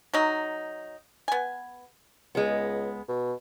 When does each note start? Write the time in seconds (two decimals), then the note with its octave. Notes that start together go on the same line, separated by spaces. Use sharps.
0.14 F#3 D#4
1.28 B3 G#5
2.35 C#2 G#3 B3
3.08 B2